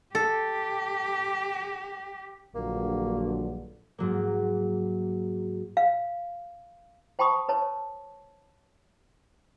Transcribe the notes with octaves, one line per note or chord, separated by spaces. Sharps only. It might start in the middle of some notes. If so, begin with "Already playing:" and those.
G4 A4
A#1 G2 D3 F#3 A#3
G#2 F#3 A#3
F5
C5 G5 A5 B5 C#6 D#6
B4 C#5 A5